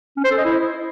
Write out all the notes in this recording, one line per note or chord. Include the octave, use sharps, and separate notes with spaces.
C#4
C5
A4
D#5
E4